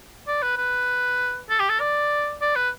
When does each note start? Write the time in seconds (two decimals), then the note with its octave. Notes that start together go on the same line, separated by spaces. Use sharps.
0.27 D5
0.42 B4
0.57 B4
1.50 A4
1.59 G4
1.69 A4
1.80 D5
2.41 D5
2.56 B4